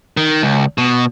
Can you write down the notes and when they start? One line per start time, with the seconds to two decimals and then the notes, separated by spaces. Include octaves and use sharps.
0.17 D#3
0.43 C#2
0.78 B2